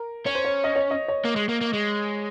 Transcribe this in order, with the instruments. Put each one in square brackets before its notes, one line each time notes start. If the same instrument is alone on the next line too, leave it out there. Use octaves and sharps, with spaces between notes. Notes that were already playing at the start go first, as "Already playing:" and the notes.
Already playing: [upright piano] A#4
[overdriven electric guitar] C#4 [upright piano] C#5
[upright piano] C5
C#5
D#5
C#5
D#5
C#5
[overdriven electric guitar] A#3
G#3
A#3
A#3
G#3